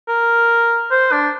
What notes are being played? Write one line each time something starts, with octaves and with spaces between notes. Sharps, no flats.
A#4
C5
D4